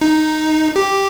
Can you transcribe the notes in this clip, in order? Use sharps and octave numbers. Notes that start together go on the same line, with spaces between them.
D#4
G4